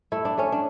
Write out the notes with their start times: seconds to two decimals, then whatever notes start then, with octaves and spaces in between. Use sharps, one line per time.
0.12 A3 E4
0.25 D4
0.38 A3 C#4
0.52 D4